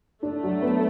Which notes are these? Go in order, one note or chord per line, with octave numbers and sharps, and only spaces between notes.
A3 D4
F#3
B3